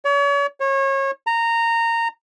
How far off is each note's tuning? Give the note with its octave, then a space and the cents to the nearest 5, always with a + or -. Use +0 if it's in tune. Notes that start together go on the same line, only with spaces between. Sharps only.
C#5 +40
C#5 -30
A#5 -15